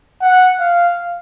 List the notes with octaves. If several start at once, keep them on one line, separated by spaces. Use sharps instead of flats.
F#5
F5